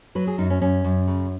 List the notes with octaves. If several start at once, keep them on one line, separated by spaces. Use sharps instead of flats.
F#3 B4
G#4
F#2 D#4
C#4
F#2 C#4
F#2
C#3